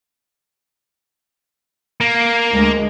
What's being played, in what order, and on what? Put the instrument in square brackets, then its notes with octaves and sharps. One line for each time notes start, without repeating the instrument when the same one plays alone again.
[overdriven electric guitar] A#3
[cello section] D2 G#3